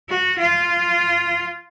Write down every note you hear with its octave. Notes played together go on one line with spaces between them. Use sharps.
F#4
F4